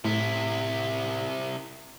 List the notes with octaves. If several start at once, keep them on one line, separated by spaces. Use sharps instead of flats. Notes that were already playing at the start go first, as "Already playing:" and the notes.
A2 C3 E4